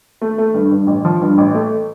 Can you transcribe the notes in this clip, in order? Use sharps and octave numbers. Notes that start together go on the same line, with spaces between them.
A3
A3
G2
G2
A1
F3
G2
A1
A3